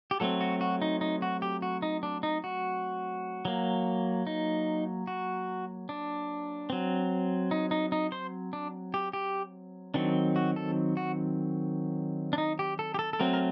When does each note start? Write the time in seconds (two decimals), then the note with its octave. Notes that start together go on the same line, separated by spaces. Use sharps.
0.11 G4
0.20 F#3 A3 C4 A4
0.41 F#4
0.61 F#4
0.82 D#4
1.01 D#4
1.22 F#4
1.42 G4
1.62 F#4
1.82 D#4
2.03 D4
2.23 D#4
2.44 F#4
3.45 F#3 A#3
4.27 D#4
5.07 F#4
5.89 D4
6.70 F#3 C4
7.51 D#4
7.71 D#4
7.92 D#4
8.12 C5
8.53 D4
8.94 G4
9.13 G4
9.94 D#3 F#3 C4 D4
10.36 F#4
10.56 A4
10.97 F#4
12.33 D4
12.38 D#4
12.59 G4
12.79 A4
12.94 G4
12.99 A4
13.13 A4
13.19 F#3 A3 C4 A#4
13.33 A#4